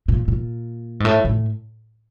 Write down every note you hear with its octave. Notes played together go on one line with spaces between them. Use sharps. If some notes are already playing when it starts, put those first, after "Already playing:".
A#2
A#2
G#2
A2
A2